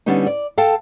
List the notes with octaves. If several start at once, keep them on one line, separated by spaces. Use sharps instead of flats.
D3 G3 B3 C#4 D#4
D5
A4 F5 G5 A5